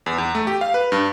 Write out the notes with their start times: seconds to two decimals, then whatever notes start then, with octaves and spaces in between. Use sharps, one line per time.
0.06 E2
0.18 E2
0.35 A3
0.47 G4
0.61 F5
0.74 B4
0.92 G2